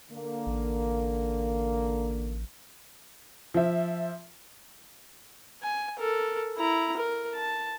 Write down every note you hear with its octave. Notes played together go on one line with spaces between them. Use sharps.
D3 A#3
A1
F3 E5
G#5
A4 A#4
E4 A#5
A#4
A5